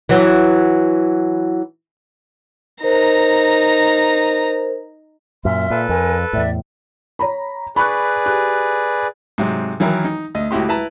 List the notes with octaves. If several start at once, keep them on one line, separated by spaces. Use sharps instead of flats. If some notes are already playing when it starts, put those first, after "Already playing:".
E3 F#3
D#4 A#4 C5 A#5
F#2 A#2 E5 C6 F6
A#2 A4 B4
F2 A#4 G#5
E2 A2 D5 E5
C#5 A#5 B5
G#4 B4 D5 B5 C#6 F#6
G4 F#6
G#2 C3 F#3
D#3 E3 F#3 E4 A#4
D#4
D2 D#5
C#2 A2 E4 F#4 G4 C6
E4 B4 A5 A#5